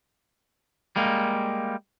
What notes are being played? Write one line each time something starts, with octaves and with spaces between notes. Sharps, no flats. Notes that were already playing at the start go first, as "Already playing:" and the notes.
G3 G#3 A#3